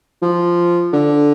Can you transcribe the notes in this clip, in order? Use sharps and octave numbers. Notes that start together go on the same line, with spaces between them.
F3
D3